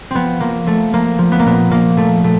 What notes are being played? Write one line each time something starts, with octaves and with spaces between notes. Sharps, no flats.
F3 B3 C4
F3 A#3
F3 A3
F3 A#3
F3
B3
A#3
A#2 B3
A#2 A#3
F3 A3
A#2 A3